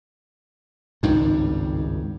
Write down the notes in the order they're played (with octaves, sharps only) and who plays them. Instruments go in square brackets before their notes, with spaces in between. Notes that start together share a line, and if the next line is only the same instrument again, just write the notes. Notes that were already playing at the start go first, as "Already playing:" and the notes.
[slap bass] G#1 C#2 G2 [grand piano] D#3